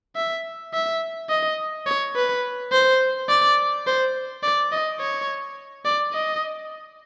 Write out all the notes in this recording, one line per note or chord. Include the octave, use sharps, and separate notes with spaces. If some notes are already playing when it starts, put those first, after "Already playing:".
E5
E5
D#5
C#5
B4
C5
D5
C5
D5
D#5
C#5
D5
D#5